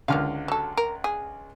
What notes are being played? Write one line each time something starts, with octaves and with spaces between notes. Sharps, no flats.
C#2 D3 D#3 F4 F5 F6
F#3 A4
A#4
G#4